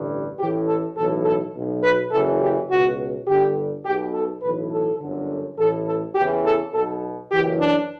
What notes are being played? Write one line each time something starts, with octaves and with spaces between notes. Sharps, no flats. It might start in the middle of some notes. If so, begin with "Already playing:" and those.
Already playing: A1 G2 D3
A1 A2 E3 G4
A4
B1 A2 E3 A4
A4
B1 B2
B4
F#1 F#2 C#3 E3 A4
G4
C#2 B2 F#4
G1 G2 D3 G4
B1 B2 G4
A4
B1 A2 E3 B4
A4
G1 F#2 D3
A1 A2 E3 A4
A4
E2 C#3 E3 G4
A4
B1 B2 A4
F#1 F#2 E3 G4
D4